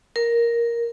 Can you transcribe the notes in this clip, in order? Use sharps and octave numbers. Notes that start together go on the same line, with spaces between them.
A#4